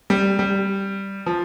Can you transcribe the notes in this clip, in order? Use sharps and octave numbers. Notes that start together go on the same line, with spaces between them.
G3
G3
F3